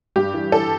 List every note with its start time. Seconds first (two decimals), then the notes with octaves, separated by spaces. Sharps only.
0.16 G2 G4
0.34 E3
0.52 E3 A4